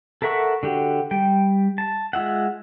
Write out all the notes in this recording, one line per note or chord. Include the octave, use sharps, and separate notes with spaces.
A4 A#4 E5 F#5 C#6
D3 F#4 G4
G3 G5
A5
G#3 F4 E5 F#5